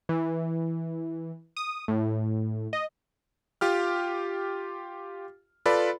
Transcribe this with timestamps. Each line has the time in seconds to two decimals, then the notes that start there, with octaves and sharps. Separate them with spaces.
0.09 E3
1.57 D#6
1.88 A2
2.73 D#5
3.61 F4 G4 F6
5.66 F4 A4 B4 D5 B5